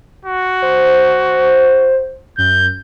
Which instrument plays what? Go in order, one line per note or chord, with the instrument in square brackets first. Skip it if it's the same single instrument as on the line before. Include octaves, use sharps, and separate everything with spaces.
[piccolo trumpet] F#4
[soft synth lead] C5
[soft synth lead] F#2 [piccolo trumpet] G6